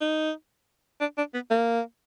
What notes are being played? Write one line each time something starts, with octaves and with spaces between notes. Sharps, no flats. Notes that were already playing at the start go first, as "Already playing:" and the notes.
D#4
D4
D4
B3
A#3